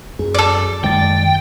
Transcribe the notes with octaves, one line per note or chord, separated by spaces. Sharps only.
F#2 G#4
A4 D5
F#2 D#3 G#3 G5 A6